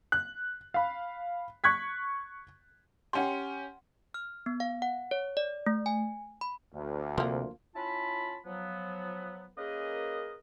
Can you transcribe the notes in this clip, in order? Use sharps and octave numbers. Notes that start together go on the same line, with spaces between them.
F#6
F5 B5
C#6 F#6 G#6 B6
C#4 G4 F#5 G5 C6
F6
B3
F5
F#5
C#5
D5
A3
G#5
B5
D2
C3 F3 A#3
C#4 E4 F4 A5 B5
F3 F#3 B3
A#3 C#4 G#4 A#4 B4 D#5